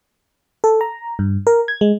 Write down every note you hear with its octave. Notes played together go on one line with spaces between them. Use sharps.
A4
A#5
G2
A#4
G#6
G#3